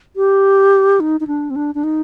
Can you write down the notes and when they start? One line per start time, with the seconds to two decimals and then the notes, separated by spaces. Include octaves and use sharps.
0.16 G4
1.00 D#4
1.20 D#4
1.27 D4
1.50 C4
1.56 D4
1.75 D4
1.84 D#4